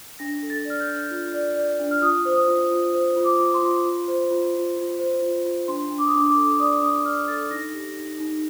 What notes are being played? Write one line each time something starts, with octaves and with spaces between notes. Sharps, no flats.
D4 A#6
A4
A6
D5 F6
G6
D4
F4
D5
D5
D4
F6
F4 D#6
C5
D#6
F4
F4
C5
F4
D6
F4
C6
F4
F4
C5
F4
F4
F4
C5
F4
F4
D4 C6
D4
D6
D#6
D4 D6
D6
A4
D5 D#6
D4 D#6
D5 F6
A4 A6
D#4 A#6
G4
D#4
D#4